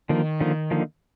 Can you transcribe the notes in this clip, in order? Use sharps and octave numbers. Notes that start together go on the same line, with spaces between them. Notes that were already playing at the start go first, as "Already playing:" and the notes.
D3 D#3 F3 A#3 D#4
D3 F3 A#3 D#4
D3 F3 A#3 D#4